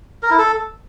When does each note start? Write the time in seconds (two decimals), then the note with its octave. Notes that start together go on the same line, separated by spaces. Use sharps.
0.23 A#4
0.30 E4
0.38 A4